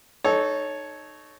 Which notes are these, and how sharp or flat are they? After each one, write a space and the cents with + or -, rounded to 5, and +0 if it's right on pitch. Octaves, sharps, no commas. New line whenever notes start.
D#4 -20 A4 -20 C#5 +0